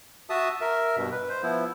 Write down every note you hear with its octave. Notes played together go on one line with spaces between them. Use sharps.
F#4 E5 A5 D#6
A#4 E5
G2 B2
B4
C5
F3 B3 E4